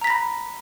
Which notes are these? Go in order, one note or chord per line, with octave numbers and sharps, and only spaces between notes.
A#5 B5 A#6 B6